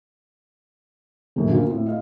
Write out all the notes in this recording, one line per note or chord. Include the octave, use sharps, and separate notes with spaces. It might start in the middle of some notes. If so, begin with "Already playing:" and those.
D#1 F#2
D2 A#3 F4
A2 C4
D#5 F5